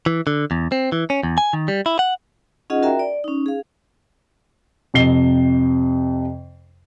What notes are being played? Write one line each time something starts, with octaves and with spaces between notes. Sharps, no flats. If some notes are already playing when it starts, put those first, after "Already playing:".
E3
D3
E2
C4
E3
C#4
E2
G#5
D#3
G3
E4
F#5
C#4 D#4 F4 G#4 D#5 F#5
F#4 A#4 E5 G5 A#5
D5
C#4 D#4
G#4 F5
F2 C3 D#5 C7 G7